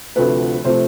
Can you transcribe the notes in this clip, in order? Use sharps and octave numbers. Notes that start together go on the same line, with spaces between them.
D2 C3 F3 A3 B4
C3 F3 A3 C5